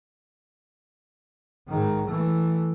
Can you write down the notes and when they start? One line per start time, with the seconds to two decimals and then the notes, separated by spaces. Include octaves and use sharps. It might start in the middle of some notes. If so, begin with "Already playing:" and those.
1.68 G#2 D#3
2.06 E3 A3